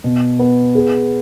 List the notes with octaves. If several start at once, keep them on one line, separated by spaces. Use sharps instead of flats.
B2
B3
G#4